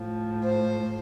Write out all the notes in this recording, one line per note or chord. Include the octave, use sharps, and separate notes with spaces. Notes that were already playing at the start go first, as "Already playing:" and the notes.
Already playing: A2 F3
C5